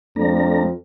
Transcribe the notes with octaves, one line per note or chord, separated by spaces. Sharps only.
F2 A3 D4 A#5